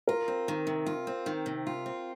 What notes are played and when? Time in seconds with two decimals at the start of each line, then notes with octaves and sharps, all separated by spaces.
0.07 F4 A#4
0.28 C4
0.48 D#3
0.67 C3
0.86 F4
1.07 C4
1.26 D#3
1.46 C3
1.67 F4
1.86 C4